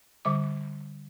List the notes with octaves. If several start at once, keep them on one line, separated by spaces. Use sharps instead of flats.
D3 G3 D6